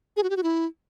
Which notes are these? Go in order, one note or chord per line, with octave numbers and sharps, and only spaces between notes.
G#4
F#4
G4
F#4
E4